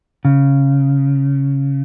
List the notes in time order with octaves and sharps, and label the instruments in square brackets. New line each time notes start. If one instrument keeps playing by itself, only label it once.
[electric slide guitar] C#3